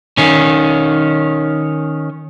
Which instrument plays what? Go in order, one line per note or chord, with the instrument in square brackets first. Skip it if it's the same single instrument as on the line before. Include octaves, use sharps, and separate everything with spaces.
[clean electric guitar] D#3 C#4